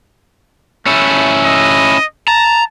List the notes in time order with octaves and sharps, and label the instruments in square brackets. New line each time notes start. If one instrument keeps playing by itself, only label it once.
[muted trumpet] A3 [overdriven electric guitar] C#4 E4
[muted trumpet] D#5
[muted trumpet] A5 [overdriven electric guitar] A#5